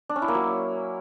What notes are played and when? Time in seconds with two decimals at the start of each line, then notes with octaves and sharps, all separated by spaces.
0.09 D4
0.16 C#4
0.22 E4
0.28 A#3
0.34 F#3